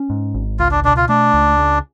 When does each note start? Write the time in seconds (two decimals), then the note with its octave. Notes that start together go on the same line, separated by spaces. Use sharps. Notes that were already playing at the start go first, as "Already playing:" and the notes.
Already playing: C#4
0.10 G#2
0.34 G#1
0.59 C#2 F4
0.71 D4
0.84 B2 D4
0.97 F4
1.09 A3 D4
1.34 C#2
1.59 C#3